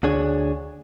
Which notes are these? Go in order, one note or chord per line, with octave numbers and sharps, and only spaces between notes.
D2 D4 G#4 C#5